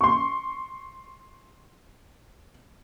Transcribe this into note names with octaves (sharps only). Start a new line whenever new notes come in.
C6 C#6